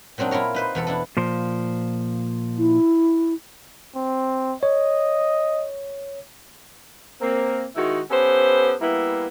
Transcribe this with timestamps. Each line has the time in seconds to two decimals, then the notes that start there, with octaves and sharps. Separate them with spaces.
0.18 A#2 F#3 C4 D4 D#4
0.31 E4 F4 A#4 C#5
0.55 D#4 B4 C5
0.75 E2 B2 A4
0.87 D4 E4 A4
1.17 A#2 F3 C5
2.58 E4
3.95 C4
4.63 C#5 D#5
7.21 A#3 C4
7.76 D#3 G#3 D#4 E4 F#4
8.11 B3 C#4 G4 A4 B4 C5
8.81 G3 A#3 B3 E4